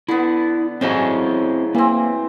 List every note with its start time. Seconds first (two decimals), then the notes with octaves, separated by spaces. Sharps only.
0.08 D3 B3 E4
0.81 A2 C#3 F#3 C4 C5 D#5
1.75 E3 A#3 C4